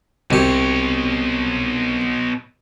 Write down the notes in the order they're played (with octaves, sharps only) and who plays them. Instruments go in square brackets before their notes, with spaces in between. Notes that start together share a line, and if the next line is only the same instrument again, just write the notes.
[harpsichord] C2 G4 [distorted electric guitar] B2 C#5